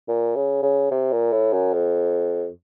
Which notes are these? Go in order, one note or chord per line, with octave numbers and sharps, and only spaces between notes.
A#2
C#3
C#3
C3
A#2
A2
F#2
F2